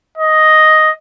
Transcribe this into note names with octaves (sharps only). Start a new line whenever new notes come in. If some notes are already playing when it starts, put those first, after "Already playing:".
D#5